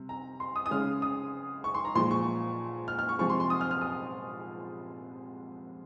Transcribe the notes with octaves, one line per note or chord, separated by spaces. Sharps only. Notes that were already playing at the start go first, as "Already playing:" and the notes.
Already playing: C3 G3
A#5
C6
D#6
D#6
C#3 G#3 F6
D#6
C#6
C6
A#5
A#2 F3 G#3 C6
C#6
F6
F6
C#6
C3 F3 G#3 C#6
C6
C6
D#6
F6
F6
D#6